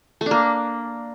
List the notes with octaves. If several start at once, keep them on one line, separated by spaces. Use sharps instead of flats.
A3
D4
A#3